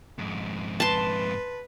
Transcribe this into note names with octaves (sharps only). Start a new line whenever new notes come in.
F2 G#2
B4 A5 C6